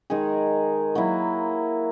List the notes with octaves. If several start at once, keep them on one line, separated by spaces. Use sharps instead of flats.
D#3 G#3 D#4 G#4
F#3 A#3 E4